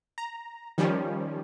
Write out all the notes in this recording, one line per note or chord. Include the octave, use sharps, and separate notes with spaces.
A#5
D#3 F3 G3 C#4